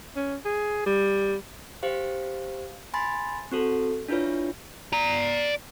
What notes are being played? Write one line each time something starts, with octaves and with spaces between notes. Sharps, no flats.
C#4
G#4
G3
G4 C5 F5
G#5 B5 C6 A6
C4 F#4 A4
D4 E4 F4 B4 C#5
D5 A#5